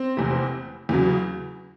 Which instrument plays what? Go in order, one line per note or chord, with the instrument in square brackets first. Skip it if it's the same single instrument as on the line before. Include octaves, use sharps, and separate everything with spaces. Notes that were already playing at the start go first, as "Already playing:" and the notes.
Already playing: [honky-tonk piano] C4
F1 E2 C3
E2 C#3 F#3